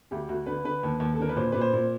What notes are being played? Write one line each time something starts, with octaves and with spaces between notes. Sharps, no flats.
D2 G4
D2 F#4
D3 B4
D3 B4
D#2
D#2
A4
D3 A#4
B4
A#2 C5
A#2 B4
C5
A#2